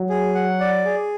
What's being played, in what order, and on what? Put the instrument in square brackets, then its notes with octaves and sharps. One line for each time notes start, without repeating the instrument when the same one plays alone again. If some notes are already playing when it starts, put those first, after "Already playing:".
Already playing: [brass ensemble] F#3
[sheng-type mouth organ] G#4
F#5
D5
G#4